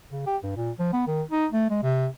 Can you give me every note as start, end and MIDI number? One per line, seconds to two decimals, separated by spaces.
0.11 0.24 49
0.27 0.37 67
0.43 0.51 43
0.57 0.71 46
0.79 0.88 53
0.93 1.04 59
1.07 1.23 51
1.31 1.47 63
1.52 1.66 57
1.70 1.78 56
1.83 2.07 48